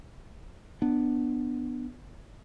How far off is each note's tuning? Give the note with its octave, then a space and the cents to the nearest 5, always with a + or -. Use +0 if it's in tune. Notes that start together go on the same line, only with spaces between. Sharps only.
B3 +0 D4 +15